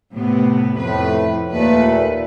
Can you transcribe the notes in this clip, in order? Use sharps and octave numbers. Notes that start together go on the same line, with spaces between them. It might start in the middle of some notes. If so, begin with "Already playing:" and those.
A2 C3 B3
F2 A2 B4
D#2 A#2 A3 B4